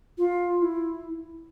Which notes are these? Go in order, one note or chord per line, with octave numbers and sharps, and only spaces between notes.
F4
E4